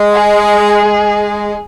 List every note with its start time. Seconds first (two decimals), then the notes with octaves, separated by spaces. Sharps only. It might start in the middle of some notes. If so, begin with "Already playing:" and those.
Already playing: G#3
0.14 G#4
0.83 G#3